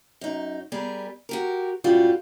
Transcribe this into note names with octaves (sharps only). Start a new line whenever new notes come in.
F#2 D#4
G3 B3 G#4 A#4
F#4 G4 A#4
F#2 A2 G3 F4 F#4